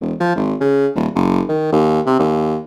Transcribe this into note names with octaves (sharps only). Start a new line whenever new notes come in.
E1
F3
G#1
C#3
D#1
F#1
D#3
D#2
C3
D#2